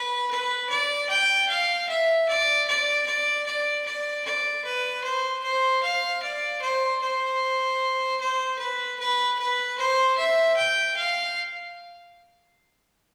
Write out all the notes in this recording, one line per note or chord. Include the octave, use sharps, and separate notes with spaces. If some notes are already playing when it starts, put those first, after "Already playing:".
Already playing: B4
B4
D5
G5
F5
E5
D5
D5
D5
D5
D5
D5
B4
C5
C5
F5
D5
C5
C5
C5
B4
B4
B4
C5
E5
G5
F5